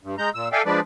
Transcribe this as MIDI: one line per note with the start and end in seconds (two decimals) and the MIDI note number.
0.03 0.15 43
0.18 0.30 56
0.18 0.30 82
0.18 0.30 91
0.34 0.48 46
0.34 0.48 88
0.52 0.62 69
0.52 0.62 74
0.52 0.62 76
0.52 0.62 77
0.52 0.62 79
0.52 0.62 80
0.66 0.80 53
0.66 0.80 56
0.66 0.80 62
0.66 0.80 71
0.66 0.80 74